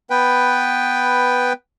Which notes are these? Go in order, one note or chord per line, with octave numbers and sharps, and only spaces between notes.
B3 B4 G5